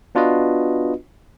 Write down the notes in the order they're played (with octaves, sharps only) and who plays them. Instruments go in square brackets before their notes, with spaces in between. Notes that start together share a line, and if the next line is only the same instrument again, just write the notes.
[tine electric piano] B3 D4 F4 F#4 B4 D#5